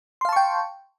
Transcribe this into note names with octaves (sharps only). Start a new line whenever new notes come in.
F5 G5 A5 C6 C#6